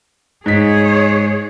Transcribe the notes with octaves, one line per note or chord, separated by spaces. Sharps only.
G#2 G#4 C#5 B6